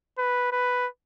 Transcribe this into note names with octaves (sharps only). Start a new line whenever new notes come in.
B4
B4